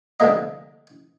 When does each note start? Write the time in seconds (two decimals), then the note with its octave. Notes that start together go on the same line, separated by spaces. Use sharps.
0.20 C2 D3 F3 A3 A#3 D#5